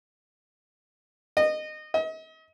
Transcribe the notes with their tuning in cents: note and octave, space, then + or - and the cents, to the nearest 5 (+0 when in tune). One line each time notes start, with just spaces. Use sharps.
D#5 -20
D#5 +40